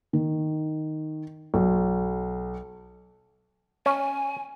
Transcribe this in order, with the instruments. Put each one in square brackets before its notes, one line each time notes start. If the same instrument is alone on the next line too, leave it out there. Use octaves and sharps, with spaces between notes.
[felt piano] D#3
B1
[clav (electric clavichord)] C#4 [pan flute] G#5